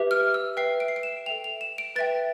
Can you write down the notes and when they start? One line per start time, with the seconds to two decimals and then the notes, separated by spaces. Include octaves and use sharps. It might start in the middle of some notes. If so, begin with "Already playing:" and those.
Already playing: G4 B4 E5
0.11 F6
0.34 E6
0.57 B4 E5 G5 C7
0.80 D7
0.88 C7
0.96 D7
1.03 E7
1.26 A4 E5 G5 F7
1.44 F7
1.61 E7
1.78 D7
1.96 B4 A6
1.99 E5 G5